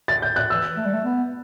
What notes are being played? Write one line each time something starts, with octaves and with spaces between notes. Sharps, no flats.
A6
G6
F#6
E3 E6
A3
G3
A3
B3